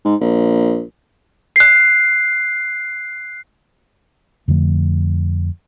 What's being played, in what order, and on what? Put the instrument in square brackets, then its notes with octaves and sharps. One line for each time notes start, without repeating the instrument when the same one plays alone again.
[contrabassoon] G#2
A#1
[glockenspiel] F#6 C7
[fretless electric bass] F2 D3 F3 A3